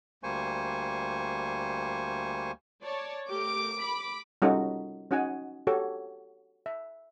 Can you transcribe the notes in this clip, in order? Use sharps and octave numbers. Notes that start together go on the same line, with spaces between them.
D2 G3 A#3 C5 G#5 C#6
C#5 D5 A5
A3 G4 A#4 D6
B5
G3 C#4 D#4 F4 F#4 A4
C#4 D#4 F#4 F#5 G#5
F#4 G4 A4 C#5
E5